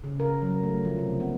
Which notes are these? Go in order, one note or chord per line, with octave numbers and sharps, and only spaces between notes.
C#3
A#4
F#3
A3
F3
C3
B3